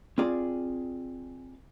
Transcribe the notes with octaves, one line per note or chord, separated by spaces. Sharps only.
C4 F4 G#4 D5